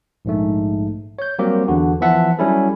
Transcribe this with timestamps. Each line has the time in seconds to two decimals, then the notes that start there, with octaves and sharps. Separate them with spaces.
0.25 A#1 G#2 A3
1.19 C#5 G6
1.39 F#3 G3 A#3 C4 G4
1.68 E2 D3 F#4
2.01 E3 F3 B3 E5 F#5 A5
2.39 F#3 G3 C#4 E4 A4